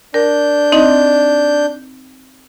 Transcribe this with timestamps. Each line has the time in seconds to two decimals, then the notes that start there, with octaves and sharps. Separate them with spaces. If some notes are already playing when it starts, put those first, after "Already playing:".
0.14 D4 A#4 G6
0.72 C4 D#4 D#5